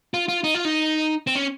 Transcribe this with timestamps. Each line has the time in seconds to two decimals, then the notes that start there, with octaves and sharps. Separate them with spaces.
0.14 F4
0.28 F4
0.44 D#4
0.54 F4
0.65 D#4
1.27 C4
1.35 C#4